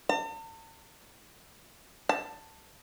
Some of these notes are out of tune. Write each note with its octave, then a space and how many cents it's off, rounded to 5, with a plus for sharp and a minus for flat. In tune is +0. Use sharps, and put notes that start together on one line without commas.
A5 +45
A5 +15